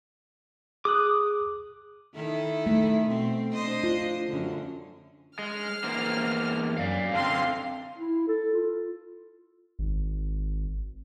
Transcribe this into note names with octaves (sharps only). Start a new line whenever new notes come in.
G#4 D6 D#6 F#6
D#3 E4 A4
A3
B2 C4
D4 C5 D#5
F4
F#2 D3
G#3 F6
E2 A#3 C5
F#2 D5 F5
D3 C4 F5 C6
E4
A4
F4
G#1